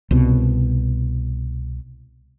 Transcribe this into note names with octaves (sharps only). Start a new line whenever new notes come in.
C2 B2